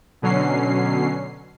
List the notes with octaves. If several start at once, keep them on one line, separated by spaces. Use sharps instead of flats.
B2 D3 F#3 C#4 C7